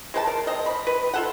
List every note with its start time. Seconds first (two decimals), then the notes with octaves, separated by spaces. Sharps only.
0.14 G#3 B4 A5
0.27 A#4
0.47 C4 D#5
0.66 B5
0.87 B4
1.14 F4 A4 F#5